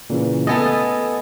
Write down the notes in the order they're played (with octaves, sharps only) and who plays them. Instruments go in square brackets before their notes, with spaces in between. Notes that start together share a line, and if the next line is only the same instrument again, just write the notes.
[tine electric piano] A#2 C#3 E3
[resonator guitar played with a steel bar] A3 B3 A4 [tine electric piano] D#5 G#5